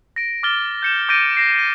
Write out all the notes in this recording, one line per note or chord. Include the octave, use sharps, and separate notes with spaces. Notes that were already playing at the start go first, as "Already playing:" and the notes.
A#6 D7
D6 F6 A6 G7
G6 C#7 E7
D6 G6 A6 A#6 D7 D#7
A#6 C7 D7
D#7